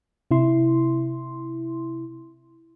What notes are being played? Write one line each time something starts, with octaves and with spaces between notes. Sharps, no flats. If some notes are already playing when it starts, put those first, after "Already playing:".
C3 E4 C6